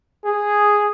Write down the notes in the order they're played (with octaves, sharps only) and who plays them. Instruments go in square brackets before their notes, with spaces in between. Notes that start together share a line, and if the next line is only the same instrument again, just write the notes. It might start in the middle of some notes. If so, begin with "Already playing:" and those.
[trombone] G#4